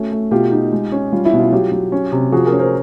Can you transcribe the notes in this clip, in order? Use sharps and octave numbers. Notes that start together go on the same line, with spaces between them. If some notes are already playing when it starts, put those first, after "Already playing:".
Already playing: A3 C#4 F#4
A3
B2 F4 G4
D#4
G#3
C#4
G3 F4
E4
B2
F4
F#3 F4 G4
F#3
C#4
C3
F3 F#4 G#4
G#4 A#4
C#4
A#4 C5